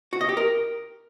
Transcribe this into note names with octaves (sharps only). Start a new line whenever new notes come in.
F#4
D#5
G4
A#4